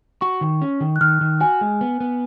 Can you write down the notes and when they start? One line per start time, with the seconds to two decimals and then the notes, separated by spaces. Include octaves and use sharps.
0.21 F#4 C#6
0.41 D#3
0.62 C#4
0.81 D#3
0.96 F#6
1.01 D#3 F6
1.21 D#3
1.40 F#4 G#5
1.61 G#3
1.81 B3
2.00 B3